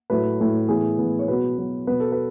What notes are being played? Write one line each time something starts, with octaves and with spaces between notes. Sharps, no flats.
A2 F#3 A3 B4
A2 F#3 A3
A2 E3 B3 G#4
A2 E3 B3
C#5
B2 F#3 B3 B4
B2 F#3 B3
B2 F#3 B3 B4
A4
B4